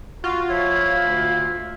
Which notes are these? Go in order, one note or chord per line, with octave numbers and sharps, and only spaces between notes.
F4 F#4
F3 E4 C#5
D2